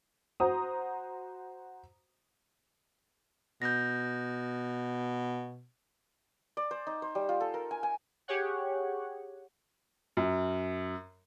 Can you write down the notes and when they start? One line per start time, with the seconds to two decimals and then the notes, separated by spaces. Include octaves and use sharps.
0.40 F#4 C5 A#5 D#6
3.62 B2 G6 A#6
6.57 D5
6.71 C5
6.87 D#4
7.02 C5
7.15 G3
7.29 F4
7.40 A4
7.54 A#4
7.71 G#5
7.83 G#5
8.28 G4 G#4 C#5 F#5
10.17 F#2